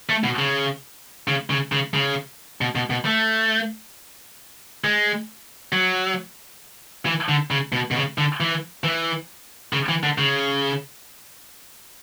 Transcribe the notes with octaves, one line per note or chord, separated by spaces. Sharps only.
A3
B2
C#3
C#3
C#3
C#3
C#3
B2
B2
B2
A3
G#3
F#3
E3
D3
C#3
B2
B2
C#3
D3
E3
E3
C#3
E3
D3
C#3